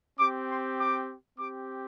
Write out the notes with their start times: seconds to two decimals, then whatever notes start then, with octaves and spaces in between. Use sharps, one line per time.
0.19 C4 G4 D6
0.48 C6
0.79 D6
1.38 C4 G4 D6